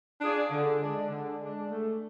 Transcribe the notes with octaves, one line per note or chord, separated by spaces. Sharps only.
D4 F4 G#4 D5
D3
G#3 D4
D3
G#3 D4
A3